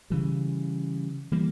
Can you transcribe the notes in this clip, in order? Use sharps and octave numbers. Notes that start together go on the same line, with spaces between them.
C#3 E3 G3
E3 G3 A#3